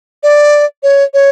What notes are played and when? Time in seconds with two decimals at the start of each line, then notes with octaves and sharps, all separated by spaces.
0.23 D5
0.83 C#5
1.14 C#5